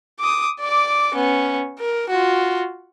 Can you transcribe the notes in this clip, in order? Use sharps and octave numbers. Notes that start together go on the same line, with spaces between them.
D6 D#6
D5 D6
B3 C#4
A#4
F4 F#4